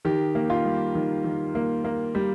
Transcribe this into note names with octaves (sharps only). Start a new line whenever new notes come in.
D#3 G4
A#3
F4
G3
D#3
D#3
A#3
A#3
G3